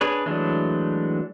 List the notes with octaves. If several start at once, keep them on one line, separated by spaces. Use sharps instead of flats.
D4 G#4 B4 C#5
E3 F#3 G#3 A3 D4